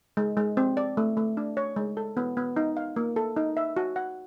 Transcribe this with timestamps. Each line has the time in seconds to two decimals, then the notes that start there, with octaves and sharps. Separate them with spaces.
0.17 G#3
0.37 G#3
0.57 C4
0.77 D5
0.97 A3
1.17 A3
1.37 D4
1.57 C#5
1.76 G#3
1.97 A4
2.17 B3
2.37 B3
2.57 D#4
2.77 F5
2.96 A#3
3.16 A4
3.37 D#4
3.57 E5
3.77 F#4
3.96 F#5